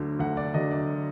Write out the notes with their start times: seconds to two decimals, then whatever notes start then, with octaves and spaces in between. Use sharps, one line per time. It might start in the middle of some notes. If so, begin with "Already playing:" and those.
Already playing: D2 D3 F#3
0.19 D2 F#5
0.37 D5
0.54 D3 F#3 D#5
0.71 D5